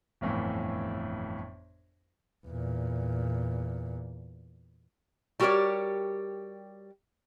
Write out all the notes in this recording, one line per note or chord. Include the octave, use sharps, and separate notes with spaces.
G1 F2 A2 E3
E2 A#2
G3 F#4 G4 A#4 C#5 D5